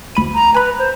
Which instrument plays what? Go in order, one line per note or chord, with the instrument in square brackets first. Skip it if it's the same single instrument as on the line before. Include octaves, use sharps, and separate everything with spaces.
[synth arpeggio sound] D2 B5 D#7
[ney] A#5
[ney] B4 [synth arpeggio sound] G#5 B5
[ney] C5